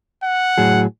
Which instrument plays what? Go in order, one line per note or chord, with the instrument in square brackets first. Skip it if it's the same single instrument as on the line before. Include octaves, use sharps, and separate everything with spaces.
[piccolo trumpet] F#5
[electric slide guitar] A2 F#3 G#4